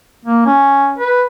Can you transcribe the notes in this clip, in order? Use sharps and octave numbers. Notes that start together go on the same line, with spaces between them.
A#3
C#4
B4